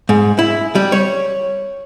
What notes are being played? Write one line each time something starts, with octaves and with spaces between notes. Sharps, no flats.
G#2
E4
G3
C#5